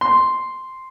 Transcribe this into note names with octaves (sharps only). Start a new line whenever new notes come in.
C6